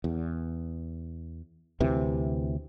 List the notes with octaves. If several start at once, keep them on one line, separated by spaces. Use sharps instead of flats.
E2
D2 C3 E3